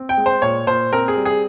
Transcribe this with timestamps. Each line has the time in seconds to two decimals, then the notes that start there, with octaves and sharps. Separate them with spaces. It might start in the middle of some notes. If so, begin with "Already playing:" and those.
Already playing: C4
0.09 G5
0.17 G#3
0.26 C5
0.42 A#2 C#5
0.67 A#2 C5
0.93 C4 A#4
1.08 G#4
1.17 G3
1.25 G#4